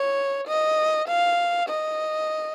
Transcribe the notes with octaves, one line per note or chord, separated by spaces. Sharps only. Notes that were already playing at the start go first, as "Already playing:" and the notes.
Already playing: C#5
D#5
F5
D#5